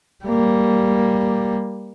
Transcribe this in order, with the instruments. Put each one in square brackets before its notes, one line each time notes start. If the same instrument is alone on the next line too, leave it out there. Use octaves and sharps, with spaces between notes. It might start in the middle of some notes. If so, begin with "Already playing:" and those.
[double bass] G3 A#3